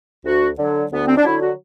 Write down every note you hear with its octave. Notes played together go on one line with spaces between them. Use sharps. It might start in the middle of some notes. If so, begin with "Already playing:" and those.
D2 F#4
D3 F#3
D2 B3
C4
D4
D3 F#3 E4
F#4